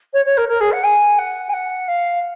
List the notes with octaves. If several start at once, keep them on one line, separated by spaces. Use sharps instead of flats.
C#5
C#5
A#4
A#4
G#4
F#5
G#5
F#5
G#5
F#5
F5